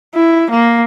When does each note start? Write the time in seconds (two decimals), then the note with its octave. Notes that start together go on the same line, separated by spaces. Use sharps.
0.14 E4
0.50 A#3